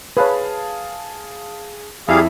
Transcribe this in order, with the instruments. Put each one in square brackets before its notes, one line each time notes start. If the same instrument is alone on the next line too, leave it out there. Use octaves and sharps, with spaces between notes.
[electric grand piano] G#4 F5 A5 [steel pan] B4 C#5
[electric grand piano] F2 [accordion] G3 G#4 F5 [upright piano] E4